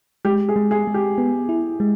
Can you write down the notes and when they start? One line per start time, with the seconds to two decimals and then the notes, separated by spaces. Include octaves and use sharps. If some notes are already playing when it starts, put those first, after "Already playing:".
0.25 G#3 G4
0.49 G#4
0.56 G#3
0.71 G#4
0.87 G#3
0.94 G4
1.18 B3
1.49 E4
1.80 G#3